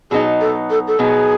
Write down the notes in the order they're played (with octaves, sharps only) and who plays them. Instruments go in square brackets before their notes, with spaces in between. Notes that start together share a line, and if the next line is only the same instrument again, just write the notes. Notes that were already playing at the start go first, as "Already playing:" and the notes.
[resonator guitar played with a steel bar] B2 F#3 B3 D#4 [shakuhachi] G#4
[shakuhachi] A4
A4
A4
[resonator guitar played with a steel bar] B2 F#3 B3 D#4 [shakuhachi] G#4